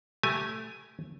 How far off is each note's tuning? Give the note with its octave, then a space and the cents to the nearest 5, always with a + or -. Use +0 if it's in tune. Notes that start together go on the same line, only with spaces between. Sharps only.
A3 +0 G4 -10 G#5 +0